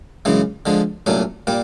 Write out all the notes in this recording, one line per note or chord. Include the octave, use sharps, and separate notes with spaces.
F#2 C#3 E3 G#3
D3 F3 G#3
C2 A#2 F#3 A3 C#4
A#2 G3 A#3